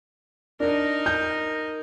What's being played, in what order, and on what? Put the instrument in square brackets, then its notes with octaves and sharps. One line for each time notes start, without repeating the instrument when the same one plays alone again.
[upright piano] D4 [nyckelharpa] D#4 A#4
[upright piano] G6